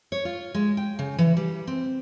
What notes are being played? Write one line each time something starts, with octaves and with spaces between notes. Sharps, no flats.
C#5
F4
G#3
G5
C#3
E3
G3
C4